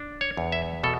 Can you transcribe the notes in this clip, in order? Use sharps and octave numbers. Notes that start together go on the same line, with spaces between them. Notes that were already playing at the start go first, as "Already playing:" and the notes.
Already playing: D4
C#5
E2
E5
B2 A4